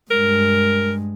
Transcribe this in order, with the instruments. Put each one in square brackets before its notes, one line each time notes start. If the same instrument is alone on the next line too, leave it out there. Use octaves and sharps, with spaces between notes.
[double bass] G2 G#3 [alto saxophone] A#4